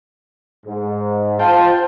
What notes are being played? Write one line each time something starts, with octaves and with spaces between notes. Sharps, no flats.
G#2
F4 C5 G5 A5